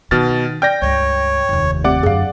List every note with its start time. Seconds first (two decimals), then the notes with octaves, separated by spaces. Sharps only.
0.11 B2 D#3 F6 A6
0.62 D5 G5 F6 G6 A#6
0.82 C#2 G2 C#5
1.49 F1 D#2
1.84 A3 C4 G4 D5 F#5 D6
2.03 F#2 D3 G#4 F5